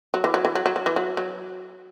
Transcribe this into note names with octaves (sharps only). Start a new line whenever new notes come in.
F#3
E3
F#3
E3
F#3
F#3
F#3
E3
F#3
F#3